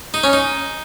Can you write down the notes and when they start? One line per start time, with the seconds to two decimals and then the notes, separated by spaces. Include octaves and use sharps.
0.14 D#4
0.24 C#4
0.33 D#4